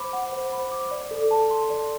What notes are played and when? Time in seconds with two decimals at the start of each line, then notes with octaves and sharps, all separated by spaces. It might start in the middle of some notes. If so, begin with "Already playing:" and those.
Already playing: C5 B5 D6
0.13 F#5
0.32 C5
0.52 B5
0.72 D6
0.91 D5
1.11 A4
1.31 A5
1.51 C6
1.70 D5